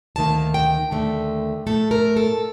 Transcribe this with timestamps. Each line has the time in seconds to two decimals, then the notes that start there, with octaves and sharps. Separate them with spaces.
0.16 D2 C3 D#3 A#3 A5
0.54 G5
0.91 D#2 D3 A3
1.67 A2 A3 A4
1.91 A#4
2.17 A4